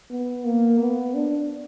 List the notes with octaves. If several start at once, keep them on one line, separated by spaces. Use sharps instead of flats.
B3
A#3
B3
D4